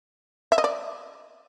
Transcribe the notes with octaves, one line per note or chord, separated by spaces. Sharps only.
E5
D#5
D5